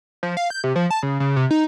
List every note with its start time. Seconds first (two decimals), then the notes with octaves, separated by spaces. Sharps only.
0.23 F3
0.37 F5
0.50 G6
0.64 C3
0.76 F3
0.91 A5
1.03 C#3
1.20 C#3
1.36 C3
1.51 D#4